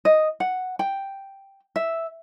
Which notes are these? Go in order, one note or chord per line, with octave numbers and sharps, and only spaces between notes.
D#5
F#5
G5
E5